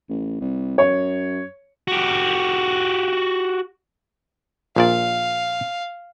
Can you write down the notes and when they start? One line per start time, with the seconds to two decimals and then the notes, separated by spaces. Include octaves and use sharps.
0.09 A1
0.40 C2
0.78 F#2 C#5
1.88 F#4 G4
4.76 A#1 A#2 D5 F5